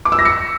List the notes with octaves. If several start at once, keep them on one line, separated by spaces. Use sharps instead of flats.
D6
E6
A#6
C#7